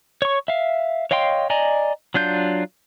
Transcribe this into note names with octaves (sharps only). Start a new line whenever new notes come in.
C#5 C#6
E5 F5
C#5 D#5 F5 G5 C6
D5 D#5 G#5 A#5
F#3 D4 F4 G6